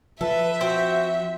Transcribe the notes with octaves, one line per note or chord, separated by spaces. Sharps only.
F3 A4 B4 E5
C4 F#4 C5